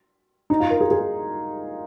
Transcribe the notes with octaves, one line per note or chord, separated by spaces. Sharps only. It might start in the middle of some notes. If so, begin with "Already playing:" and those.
D#4
F4
A#4
G#4
G#4